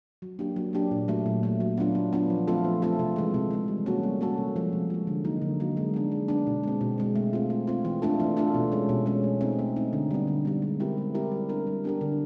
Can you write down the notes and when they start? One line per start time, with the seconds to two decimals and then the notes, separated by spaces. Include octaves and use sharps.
0.22 F#3
0.39 A#3 D4 G4
0.56 F#3
0.73 A#3 D4 G4
0.91 A#2
1.08 F#3 A3
1.26 A#2
1.43 F#3 A3
1.60 F#3
1.77 B3 D4 F4
1.95 F#3
2.13 B3 D4 F4
2.30 F3
2.48 A3 C4 F4 A4
2.65 F3
2.82 A3 C4 F4 A4
2.99 C3
3.16 E3 G#3
3.34 C3
3.51 E3 G#3
3.68 G3
3.86 A#3 C#4 F#4 A4
4.03 G3
4.21 A#3 C#4 F#4 A4
4.38 C3
4.56 F3 G#3
4.73 C3
4.90 F3 G#3
5.07 D3
5.24 F#3 A#3 D#4
5.42 D3
5.60 F#3 A#3 D#4
5.77 G#3
5.94 B3 D4
6.12 G#3
6.28 B3 D4
6.47 B2
6.63 G#3 C4
6.81 B2
6.98 G#3 C4
7.15 A3
7.33 C4 F4
7.50 A3
7.67 C4 F4
7.85 E3
8.02 A3 D4 F4 A4
8.20 E3
8.37 A3 D4 F4 A4
8.54 B2
8.72 G#3 C#4
8.89 B2
9.06 G#3 C#4
9.24 A3
9.41 C4 D#4
9.59 A3
9.76 C4 D#4
9.93 D3
10.11 G3 B3
10.28 D3
10.45 G3 B3
10.62 G#3
10.80 C4 E4 G4 A#4
10.98 G#3
11.15 C4 E4 G4 A#4
11.32 G3
11.49 B3 D4 G4 A#4
11.67 G3
11.84 B3 D4 G4 A#4
12.01 D3